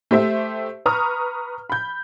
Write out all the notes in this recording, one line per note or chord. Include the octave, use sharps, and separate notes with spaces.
A3 G4 C5 E5
B4 A#5 C#6 D#6 F6
B5 G6